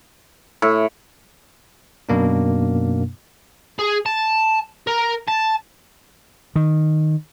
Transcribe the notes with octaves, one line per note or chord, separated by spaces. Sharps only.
A2
F#2 B2 A#3 D4
G#4
A5
A#4
A5
D#3